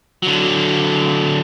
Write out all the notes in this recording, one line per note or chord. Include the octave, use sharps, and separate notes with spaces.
D3 F#3